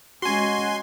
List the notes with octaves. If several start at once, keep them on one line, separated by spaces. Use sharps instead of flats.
G#3 C#4 F#4 G#5 C6